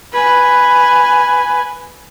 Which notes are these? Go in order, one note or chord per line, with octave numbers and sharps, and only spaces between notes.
B4 G#5